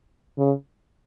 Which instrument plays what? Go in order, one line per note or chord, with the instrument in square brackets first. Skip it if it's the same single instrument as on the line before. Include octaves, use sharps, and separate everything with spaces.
[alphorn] C#3